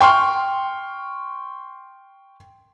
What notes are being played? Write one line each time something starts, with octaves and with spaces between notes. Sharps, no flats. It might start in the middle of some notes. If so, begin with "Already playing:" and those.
G5 C6 C#6 F6